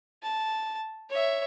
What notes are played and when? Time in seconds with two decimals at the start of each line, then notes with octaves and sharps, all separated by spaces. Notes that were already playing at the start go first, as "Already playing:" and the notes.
0.23 A5
1.10 C#5 E5